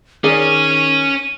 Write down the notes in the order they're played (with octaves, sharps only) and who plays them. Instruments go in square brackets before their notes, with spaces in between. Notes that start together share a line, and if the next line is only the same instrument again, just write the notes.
[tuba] D#3 [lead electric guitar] C#4 C#5 [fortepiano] G#4 A#4 D5 [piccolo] D#7